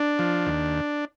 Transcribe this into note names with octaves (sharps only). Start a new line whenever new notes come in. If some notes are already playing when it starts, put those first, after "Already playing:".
Already playing: D4
F3
D#2